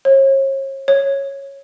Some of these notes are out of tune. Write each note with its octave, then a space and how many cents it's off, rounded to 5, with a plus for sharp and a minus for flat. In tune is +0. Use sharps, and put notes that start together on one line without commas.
C#5 -40
C#5 -10